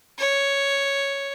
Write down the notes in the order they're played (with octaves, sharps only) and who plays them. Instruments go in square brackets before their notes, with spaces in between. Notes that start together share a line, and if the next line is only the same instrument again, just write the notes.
[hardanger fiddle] C#5